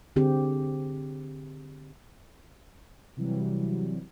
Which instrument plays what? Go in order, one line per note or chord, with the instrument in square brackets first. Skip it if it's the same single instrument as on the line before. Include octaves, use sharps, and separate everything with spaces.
[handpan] D3 C4 G4 G#4
[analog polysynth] C3 E3 F#3 G3